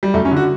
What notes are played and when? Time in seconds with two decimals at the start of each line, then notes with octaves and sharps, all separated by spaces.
0.03 G3
0.14 F#2 A3
0.25 C#4
0.31 D3
0.37 F#4